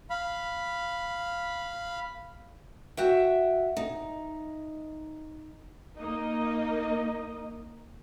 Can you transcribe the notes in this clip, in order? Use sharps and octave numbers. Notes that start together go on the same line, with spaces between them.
F5 B5
F#4 E5 G5
D#4
A#3 D#4 D#5